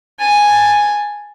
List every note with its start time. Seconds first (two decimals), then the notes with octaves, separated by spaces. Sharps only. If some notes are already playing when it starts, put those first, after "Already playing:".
0.19 G#5 A5